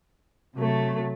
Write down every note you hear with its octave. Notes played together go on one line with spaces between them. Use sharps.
C3 F#3 A3